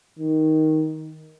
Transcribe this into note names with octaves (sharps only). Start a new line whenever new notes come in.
D#3